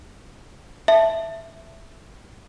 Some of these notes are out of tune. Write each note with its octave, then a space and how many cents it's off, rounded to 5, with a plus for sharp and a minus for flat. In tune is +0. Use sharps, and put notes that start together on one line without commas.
E5 +0 A5 +0